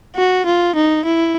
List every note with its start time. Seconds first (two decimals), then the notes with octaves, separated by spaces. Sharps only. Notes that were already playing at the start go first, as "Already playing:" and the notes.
0.16 F#4
0.46 F4
0.76 D#4
1.05 E4